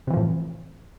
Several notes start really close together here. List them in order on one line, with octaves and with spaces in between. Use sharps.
C3 E3 F3 A2